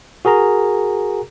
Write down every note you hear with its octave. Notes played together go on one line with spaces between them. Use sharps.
F#4 G#4 A#4 A#5